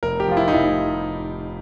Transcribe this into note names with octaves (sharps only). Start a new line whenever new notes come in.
F1 A#4
G4
F3 F4
E4
D#4
F1 E4